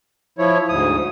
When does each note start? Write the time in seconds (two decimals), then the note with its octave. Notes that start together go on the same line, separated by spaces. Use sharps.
0.38 F3 E4 C#5
0.69 D2 G#2 D#6